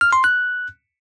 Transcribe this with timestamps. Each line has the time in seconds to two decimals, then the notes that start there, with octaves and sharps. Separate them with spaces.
0.01 F6
0.13 C6
0.24 F#6